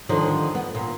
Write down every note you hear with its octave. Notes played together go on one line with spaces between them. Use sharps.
D3 D#3 F3
B3
A#2